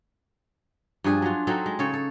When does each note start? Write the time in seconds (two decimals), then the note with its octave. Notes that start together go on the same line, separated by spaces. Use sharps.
1.04 G2 F3 D4 G#4
1.22 F#3 F4
1.47 F#3 C4 D#4 A4
1.66 G#3
1.79 C#3 A4 C#5
1.94 A4